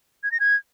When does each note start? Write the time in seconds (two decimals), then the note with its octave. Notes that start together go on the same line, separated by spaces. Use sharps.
0.23 G#6
0.32 A#6
0.40 G#6